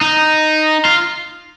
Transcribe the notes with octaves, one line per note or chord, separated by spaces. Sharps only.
D#4
F4